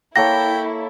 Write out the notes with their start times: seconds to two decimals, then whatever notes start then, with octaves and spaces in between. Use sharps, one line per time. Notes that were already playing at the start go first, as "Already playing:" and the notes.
0.16 A#3 E4 A4 C#5 G5 A#6